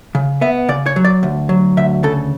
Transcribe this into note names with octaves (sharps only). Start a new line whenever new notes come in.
C#3
B3 E5
C#3 D5
C#5
F#3
D5
D2
F#3
D2 E5
C#3 A4